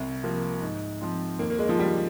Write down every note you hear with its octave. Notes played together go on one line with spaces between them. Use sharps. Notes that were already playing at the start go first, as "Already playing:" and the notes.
Already playing: C2 C4
C3 F3 A#3
G#2
F3 C4 F4
D#2 A#3
A#3
G#3
F3
C#3 G3 G#3 D#4 G4